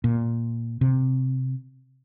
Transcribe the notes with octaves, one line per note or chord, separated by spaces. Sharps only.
A#2
C3